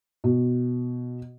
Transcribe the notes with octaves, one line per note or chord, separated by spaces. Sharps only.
B2